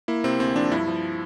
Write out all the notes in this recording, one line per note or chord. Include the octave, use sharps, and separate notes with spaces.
A#3 E4
C3 C4
D2 C4
F3 D4
G2 E4
F3